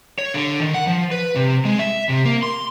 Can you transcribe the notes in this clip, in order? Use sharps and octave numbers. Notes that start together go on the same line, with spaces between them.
C#5
D3
D#3
F#5
F3
B4
C3
G#3
E5
C3
A#3
C6